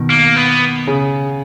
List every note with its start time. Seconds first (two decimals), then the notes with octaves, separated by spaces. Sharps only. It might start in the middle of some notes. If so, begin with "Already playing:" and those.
Already playing: B2 D#3
0.10 A#3
0.36 B3
0.87 C#3